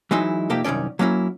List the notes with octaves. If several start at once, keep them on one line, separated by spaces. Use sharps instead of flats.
E3 F#3 G#3 D#4 E4
F2 C3 A#3 D#4 G4 E5
C2 F#2 D#3 C#4 D5
F#3 A#3 C#4 E4